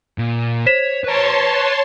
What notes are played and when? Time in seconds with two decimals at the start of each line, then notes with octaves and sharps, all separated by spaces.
0.18 A#2
0.66 C5 C#5 B6 E7
1.04 B4 C#5 A5 A#5 C6